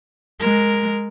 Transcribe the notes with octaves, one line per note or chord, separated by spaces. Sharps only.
G#3 A#4